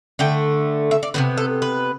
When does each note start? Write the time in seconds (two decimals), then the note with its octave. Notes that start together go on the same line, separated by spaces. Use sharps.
0.19 D3 A3 G5
0.91 E5
1.03 D5
1.14 C3 F3 B3 B4
1.37 A4
1.62 B4